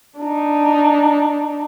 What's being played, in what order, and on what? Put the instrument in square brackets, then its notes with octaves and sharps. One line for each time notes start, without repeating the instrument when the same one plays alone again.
[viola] D4 D#4